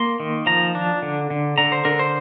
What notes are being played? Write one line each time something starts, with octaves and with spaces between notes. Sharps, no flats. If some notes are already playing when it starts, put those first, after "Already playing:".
Already playing: A#3 C6
D#3
F3 A#5
D4
D3
D3
D3 A#5
C5
D3 A#4
C5